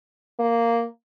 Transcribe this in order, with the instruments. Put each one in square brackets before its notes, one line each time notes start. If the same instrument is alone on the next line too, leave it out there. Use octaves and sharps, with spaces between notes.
[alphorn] A#3